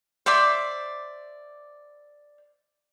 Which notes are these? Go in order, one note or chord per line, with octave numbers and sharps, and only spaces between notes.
C5 D5 E5 D6